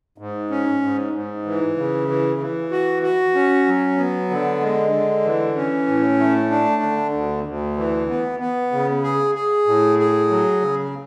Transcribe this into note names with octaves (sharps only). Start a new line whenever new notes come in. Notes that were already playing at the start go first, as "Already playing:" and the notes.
G#2
C#4
G#2
G#2
E3
C#3
E3
E3
F#4
F#4
C#4
F#3
B3
D3
G#3
D3
E3
C#4
A2
A3
D4
D3
D2
D2
E3
B3
B3
C#3
G#4
G#4
A2
G#4
F#3
C#3